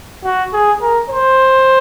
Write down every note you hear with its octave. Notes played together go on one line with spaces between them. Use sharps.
F#4
G#4
A#4
C5